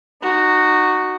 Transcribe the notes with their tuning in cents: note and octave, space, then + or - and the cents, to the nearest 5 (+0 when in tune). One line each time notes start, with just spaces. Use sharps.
D#4 -25 F#4 +0